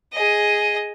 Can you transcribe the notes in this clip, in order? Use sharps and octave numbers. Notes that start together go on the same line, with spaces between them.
G#4 D#5